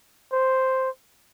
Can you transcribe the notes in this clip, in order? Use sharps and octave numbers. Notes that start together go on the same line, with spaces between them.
C5